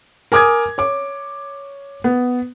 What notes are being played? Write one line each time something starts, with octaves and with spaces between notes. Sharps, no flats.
A#4 G#5 D6 D#6 G#6
C#5 D6
B3